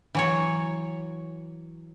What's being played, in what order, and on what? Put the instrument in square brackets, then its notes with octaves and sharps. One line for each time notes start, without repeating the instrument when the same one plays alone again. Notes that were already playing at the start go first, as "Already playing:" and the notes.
[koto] E3 F#3 C#5